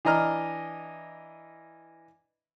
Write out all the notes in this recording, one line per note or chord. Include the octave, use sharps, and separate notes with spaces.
E3 D4 D#5 A#5 F6